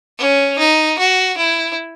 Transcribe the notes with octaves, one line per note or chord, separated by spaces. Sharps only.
C#4
D#4
F#4
E4